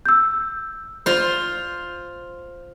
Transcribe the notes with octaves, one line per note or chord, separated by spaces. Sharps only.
E6 G6
F4 C5